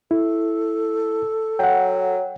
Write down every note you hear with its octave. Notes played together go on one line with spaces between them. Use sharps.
E4 A4
F#3 F#5 G5